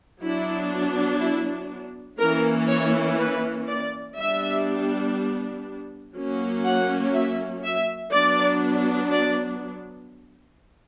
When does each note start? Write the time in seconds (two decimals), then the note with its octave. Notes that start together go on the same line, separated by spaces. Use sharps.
0.22 F#3 B3 D4 E4
1.20 E4
2.19 E3 A#3 C#4 A#4
2.68 C#5
3.19 B4
3.68 D5
4.17 G3 B3 D4 E5
6.15 F#3 A#3 C#4
6.65 F#5
7.14 E5
7.63 E5
8.12 F#3 B3 D4 D5
9.11 D5